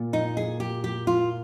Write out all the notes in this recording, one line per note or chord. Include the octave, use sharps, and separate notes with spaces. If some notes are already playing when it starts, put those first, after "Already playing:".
Already playing: A#2 A#3
D#4
G#4
G4
G4
F4